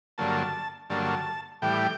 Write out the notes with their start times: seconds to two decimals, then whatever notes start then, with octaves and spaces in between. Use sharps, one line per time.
0.18 G2 D3 F#3 A#3 A5
0.90 G2 D3 F#3 A#3 A5
1.62 A2 E3 G3 G5